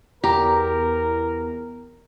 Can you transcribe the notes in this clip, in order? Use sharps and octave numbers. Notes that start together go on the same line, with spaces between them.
E2 G4 A#4 A#5